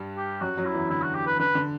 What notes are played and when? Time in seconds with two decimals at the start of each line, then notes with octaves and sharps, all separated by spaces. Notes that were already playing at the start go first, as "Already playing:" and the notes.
Already playing: G2 G3
0.17 G4
0.41 F#2 F#3 F#4
0.57 F#2 F#3
0.65 E4
0.74 E2 E3
0.90 D3 E4
1.02 F#4
1.15 G4
1.27 B4
1.39 D3 B4
1.55 D3